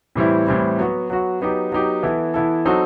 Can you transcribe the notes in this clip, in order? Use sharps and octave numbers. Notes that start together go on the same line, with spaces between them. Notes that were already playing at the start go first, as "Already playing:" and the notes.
A2 E3 G3 C4 E4
A2 E3 G3 C4 E4
F#3 B3 F#4
F#3 B3 F#4
F#3 B3 D#4 G4
F#3 B3 D#4 G4
E3 B3 E4 A4
E3 B3 E4 A4
F#3 C4 D#4 F#4 A4